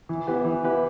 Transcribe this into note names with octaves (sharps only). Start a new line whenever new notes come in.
E3
B3 E4 G4 B4
E3
B3 E4 G4 B4